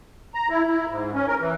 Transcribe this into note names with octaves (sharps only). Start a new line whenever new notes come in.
A#5
E4
E4
G#2
C#4
A#4
E3